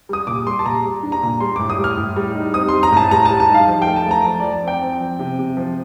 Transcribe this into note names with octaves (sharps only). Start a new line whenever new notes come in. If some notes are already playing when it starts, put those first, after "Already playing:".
G3 D#6
A#2 D6
G3 C6
A5
A#2 A#5
G3
D4
A#5
A#2
G3 C6
A2 D6
D#6
G3
F6
A2
G3
D#4
C4 D#6
G3 C6
A#5
A2 A5
G3 A#5
G3 A5
A5
D#4
F5
F3 A5
A3 G5
A5
A3 A#5
F3 A5
F3 D5
C4 G5
C4
F3
C3
C3
F3